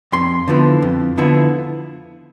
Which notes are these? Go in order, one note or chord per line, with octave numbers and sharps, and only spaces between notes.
F2 C6
D3 F3 B3 E4
F2
D3 F3 B3 E4